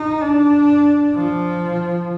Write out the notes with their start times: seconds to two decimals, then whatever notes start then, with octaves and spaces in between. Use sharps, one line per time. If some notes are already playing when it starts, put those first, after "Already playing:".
Already playing: D#4
0.22 D4
1.16 F3